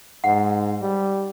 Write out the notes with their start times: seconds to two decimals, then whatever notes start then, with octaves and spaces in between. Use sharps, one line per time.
0.24 G#2 F#5
0.81 G3